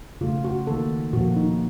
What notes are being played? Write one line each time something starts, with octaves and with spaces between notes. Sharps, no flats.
C#3 A3 F4
F#4
D#3 A#3 A4
A#2 F3 A#3 F#4
D#4